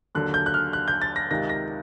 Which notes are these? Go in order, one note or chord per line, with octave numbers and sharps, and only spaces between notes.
D#2 D3 F#3 F#6
G6
F#6
F6
F#6
G6
A6
A#6
C#2 C3 D#3 A#6
A#6